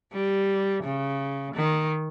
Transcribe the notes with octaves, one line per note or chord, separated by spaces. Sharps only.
G3
C#3
D#3